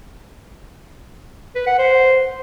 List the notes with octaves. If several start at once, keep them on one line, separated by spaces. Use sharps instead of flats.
B4
F#5
C5